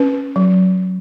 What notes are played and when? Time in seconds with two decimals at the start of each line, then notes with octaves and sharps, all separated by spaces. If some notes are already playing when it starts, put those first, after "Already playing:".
Already playing: C#4 B4
0.36 F#3